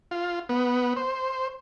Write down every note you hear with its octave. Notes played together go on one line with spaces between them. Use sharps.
F4
B3
C5